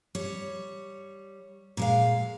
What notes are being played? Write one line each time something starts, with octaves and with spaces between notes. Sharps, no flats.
G3 C#5
A#2 G#3 F5